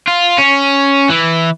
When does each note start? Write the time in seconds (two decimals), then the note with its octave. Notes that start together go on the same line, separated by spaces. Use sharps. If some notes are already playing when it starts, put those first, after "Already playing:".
0.08 F4
0.38 C#4
1.10 E3